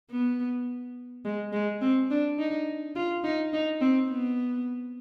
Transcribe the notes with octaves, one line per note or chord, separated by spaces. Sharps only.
B3
G#3
G#3
C4
D4
D#4
F4
D#4
D#4
C4
B3